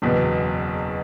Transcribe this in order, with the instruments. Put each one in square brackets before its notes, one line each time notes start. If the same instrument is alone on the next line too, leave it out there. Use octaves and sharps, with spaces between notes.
[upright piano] F#1 E2 B2